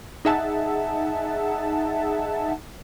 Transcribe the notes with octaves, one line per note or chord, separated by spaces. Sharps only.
D#4 G#4 E5 F#5 A5